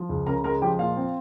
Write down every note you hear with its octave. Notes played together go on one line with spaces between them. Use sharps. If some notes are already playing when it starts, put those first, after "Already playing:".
Already playing: F3
C#2
C#3 A#4 A#5
G#3 A#4 A#5
F3 G4 G5
A#2 F4 F5
C4